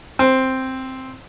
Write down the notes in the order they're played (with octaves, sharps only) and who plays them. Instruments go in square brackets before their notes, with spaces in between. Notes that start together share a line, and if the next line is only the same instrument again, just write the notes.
[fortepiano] C4